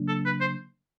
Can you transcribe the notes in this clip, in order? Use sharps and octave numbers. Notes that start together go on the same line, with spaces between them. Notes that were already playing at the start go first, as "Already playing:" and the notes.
Already playing: C#3 F#3 A#3 D4
A4
B4
C5